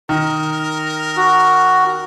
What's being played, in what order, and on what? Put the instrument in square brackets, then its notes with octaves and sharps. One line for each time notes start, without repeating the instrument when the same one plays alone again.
[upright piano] D#3 [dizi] A#4
[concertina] F#4